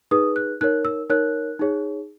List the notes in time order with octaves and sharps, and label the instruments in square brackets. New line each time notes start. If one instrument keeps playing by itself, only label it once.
[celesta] D#4 G#4 B4 D#6
F#6
D#4 A#4 C#5 F#6
E6
D#4 A#4 C#5 F#6
D#4 G#4 C#5